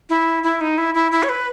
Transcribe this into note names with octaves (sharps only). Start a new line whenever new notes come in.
E4
E4
D#4
E4
E4
E4
C#5
B4